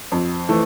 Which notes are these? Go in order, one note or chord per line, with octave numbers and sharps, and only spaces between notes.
F2
E3 A3